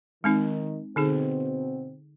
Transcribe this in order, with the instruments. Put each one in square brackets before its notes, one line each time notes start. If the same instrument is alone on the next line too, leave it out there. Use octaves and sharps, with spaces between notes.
[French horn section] D#3 [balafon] G#3 C4 D#4
[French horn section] B2 C4 [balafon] D3 D#4 G#4